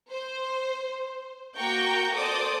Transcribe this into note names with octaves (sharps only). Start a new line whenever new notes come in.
C5
A#3 F#4 G5 A#5 C#6 G6
A4 C5 D5 D6 D#6